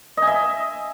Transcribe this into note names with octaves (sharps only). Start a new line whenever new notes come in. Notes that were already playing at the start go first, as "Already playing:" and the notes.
D#5 E5 G#5